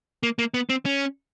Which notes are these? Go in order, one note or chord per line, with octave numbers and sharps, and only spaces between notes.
A#3
A#3
B3
C4
C#4